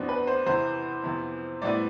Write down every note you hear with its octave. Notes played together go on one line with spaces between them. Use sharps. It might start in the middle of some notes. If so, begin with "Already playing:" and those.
Already playing: E2 B2 B3 C4 D4
B4
C5
E2 C3 E3 C5
F2 C3 E3 B3
A2 G3 B3 E4 B4 D5